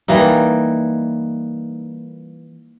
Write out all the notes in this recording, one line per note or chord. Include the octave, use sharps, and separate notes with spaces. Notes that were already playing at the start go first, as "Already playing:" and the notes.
E3 G3 A#3 D#4